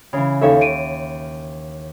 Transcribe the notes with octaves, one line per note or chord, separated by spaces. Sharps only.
C#3 E3
D#2 D#4 A4 C#5 E5 F5
D7 D#7